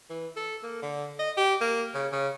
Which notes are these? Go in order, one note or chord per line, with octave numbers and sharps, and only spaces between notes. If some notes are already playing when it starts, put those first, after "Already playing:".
E3
A4
A#3
D3
D#5
G4
A#3
C#3
C#3